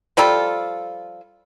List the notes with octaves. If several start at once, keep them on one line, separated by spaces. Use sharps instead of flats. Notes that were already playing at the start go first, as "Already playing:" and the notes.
F3 G3 F4 A4